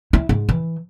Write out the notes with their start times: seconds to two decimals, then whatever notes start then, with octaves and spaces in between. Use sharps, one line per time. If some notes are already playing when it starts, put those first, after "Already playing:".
0.13 E4
0.29 G#2
0.49 E3